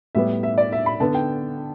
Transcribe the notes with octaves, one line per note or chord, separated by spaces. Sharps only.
A2 G3 B3 E5
E5
D5
E5
B5
D3 B3 A5
G5